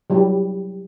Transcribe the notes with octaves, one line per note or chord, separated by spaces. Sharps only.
F#3 G3 E4 G4